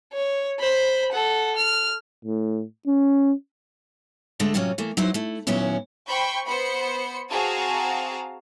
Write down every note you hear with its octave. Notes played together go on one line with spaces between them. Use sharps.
C#5
C5 B5
A4 F#5
F6
A2
C#4
D3 G#3 A3 A4
A2 C3 F#3 C#4 F4
E3 A3 A#3
F#3 D#4 E4 B4 C5
A3 E4
D#2 A#2 F#3 B3 C#4 E4
C5 G5 B5 C#6 G6
B3 C5 B5 C#7
C4 F#4 G#4 F5 A5 A#5